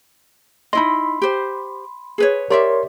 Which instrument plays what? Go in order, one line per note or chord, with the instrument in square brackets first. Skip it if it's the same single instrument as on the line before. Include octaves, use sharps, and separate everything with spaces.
[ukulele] D#4 E4 D#5 [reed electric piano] B5 C6
[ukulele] G4 C5
G#4 B4 C#5
[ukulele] G4 D5 E5 [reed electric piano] A#4 C#5 C6